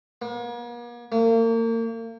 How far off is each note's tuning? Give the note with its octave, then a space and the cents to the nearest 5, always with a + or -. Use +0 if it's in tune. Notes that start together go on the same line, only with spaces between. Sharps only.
A#3 +45
A#3 -35